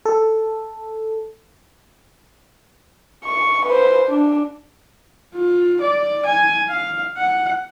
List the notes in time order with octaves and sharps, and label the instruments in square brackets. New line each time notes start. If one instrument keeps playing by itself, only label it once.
[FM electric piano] A4
[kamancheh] C#6
B4 C5
D4
[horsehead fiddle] F4
D5
G#5
F5
F#5